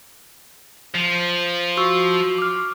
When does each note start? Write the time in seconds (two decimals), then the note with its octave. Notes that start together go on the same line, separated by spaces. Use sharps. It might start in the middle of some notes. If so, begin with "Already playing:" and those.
0.95 F3
1.77 F#4 C#6 E6
2.38 D6 F6